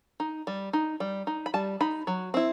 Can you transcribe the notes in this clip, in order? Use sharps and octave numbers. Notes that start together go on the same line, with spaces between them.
D#4
G3
D#4
G3
D#4
B5
G3 A5
D#4 B5
F#3
C4 E4